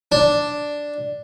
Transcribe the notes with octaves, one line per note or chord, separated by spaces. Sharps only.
D4